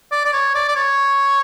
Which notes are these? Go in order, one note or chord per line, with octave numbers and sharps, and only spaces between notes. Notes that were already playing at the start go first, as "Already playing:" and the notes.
D5
D5
C#5
D5
D5
C#5